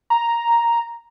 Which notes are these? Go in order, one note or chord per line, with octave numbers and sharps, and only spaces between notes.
A#5